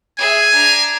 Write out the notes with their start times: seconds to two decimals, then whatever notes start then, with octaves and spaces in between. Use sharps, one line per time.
0.18 G#4 E5 G#5
0.54 D4 A#5